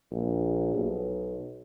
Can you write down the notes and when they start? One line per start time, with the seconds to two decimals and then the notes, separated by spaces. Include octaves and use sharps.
0.11 A#1
0.75 B1